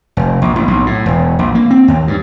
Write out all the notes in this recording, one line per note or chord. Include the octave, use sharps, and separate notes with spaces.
F1
A#1
A1
B1
A2
E1
A#1
A#3
C4
D#2
G2